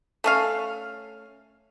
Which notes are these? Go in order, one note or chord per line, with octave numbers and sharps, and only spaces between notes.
A3 C#4 F5